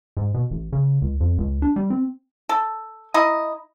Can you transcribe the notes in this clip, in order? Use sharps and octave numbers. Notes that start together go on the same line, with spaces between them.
G#2
B2
A1
C#3
C#2
F2
C#2
D4
G3
C4
A4
D#4 E4 D#5